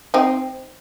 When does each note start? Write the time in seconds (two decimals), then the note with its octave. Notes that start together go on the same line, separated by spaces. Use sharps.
0.14 C4 D#4